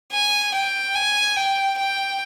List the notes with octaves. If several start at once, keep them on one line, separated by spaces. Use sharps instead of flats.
G#5
G5
G#5
G5
G5